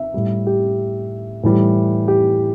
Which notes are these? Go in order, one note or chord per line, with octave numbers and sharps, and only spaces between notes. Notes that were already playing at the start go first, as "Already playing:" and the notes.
Already playing: E5
A2 G3
G4
A2 E3 G3
G4